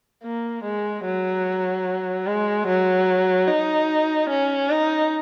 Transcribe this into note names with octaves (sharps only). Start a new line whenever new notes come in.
A#3
G#3
F#3
G#3
F#3
D#4
C#4
D#4